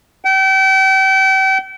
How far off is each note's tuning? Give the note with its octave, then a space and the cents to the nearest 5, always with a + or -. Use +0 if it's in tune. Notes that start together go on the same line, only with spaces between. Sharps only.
G5 -35